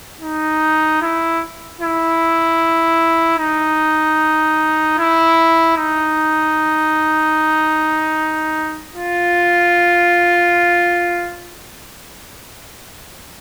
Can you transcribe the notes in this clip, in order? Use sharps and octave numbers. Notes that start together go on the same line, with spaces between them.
D#4
E4
E4
D#4
E4
D#4
F4